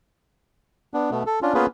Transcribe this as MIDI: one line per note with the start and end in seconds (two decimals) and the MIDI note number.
0.94 1.11 59
0.94 1.11 62
1.11 1.23 47
1.11 1.23 57
1.11 1.23 59
1.26 1.39 69
1.42 1.54 61
1.42 1.54 62
1.42 1.54 65
1.54 1.66 58
1.54 1.66 59
1.54 1.66 61
1.54 1.66 65
1.54 1.66 68
1.54 1.66 71